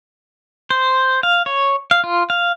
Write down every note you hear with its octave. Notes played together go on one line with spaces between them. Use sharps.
C5
F5
C#5
F5
F4
F5